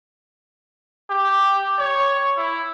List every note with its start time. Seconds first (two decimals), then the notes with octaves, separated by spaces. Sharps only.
1.10 G4
1.78 C#5
2.37 E4